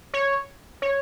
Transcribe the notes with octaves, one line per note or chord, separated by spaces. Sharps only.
C#5
C#5